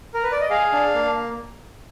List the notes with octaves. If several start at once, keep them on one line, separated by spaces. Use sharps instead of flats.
A#4
B4
D5
D#5
G#4 F5
D4
A#3